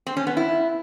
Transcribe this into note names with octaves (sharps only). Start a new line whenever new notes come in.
C4
C#4
B3
E4